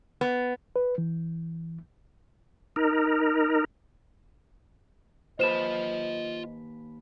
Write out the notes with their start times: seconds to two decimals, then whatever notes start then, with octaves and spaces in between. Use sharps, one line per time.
0.21 B3
0.76 B4
0.98 E3
2.76 D#4 A#4
5.40 D#2 F4 B4 C5 D#5 A5 E7